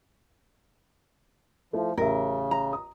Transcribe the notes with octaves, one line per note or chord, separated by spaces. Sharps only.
F3 A3 E4
A1 C#3 A#4 E5
A#5
D#6